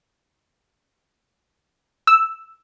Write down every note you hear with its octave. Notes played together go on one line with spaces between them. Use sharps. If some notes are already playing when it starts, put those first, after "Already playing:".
E6